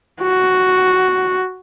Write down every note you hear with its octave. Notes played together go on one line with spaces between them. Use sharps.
F#4